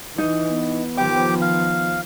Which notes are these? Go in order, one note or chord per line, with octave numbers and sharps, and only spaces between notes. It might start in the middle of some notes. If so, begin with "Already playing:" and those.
E3 D#4
B3
D#3 F3 G4 G5 D6
F5